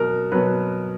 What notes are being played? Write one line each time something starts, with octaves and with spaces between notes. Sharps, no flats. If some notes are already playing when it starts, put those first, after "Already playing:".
Already playing: B2 F#3 A#4
B2 F#3 B4